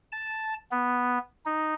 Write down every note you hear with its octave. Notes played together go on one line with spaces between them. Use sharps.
A5
B3
D#4